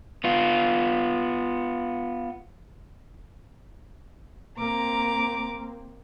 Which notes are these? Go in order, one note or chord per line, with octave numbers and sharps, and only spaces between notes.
B3 F4
A#3 C4 A#5 D6